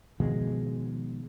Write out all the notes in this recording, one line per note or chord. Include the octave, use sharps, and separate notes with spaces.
B2 D#3 F3 G#3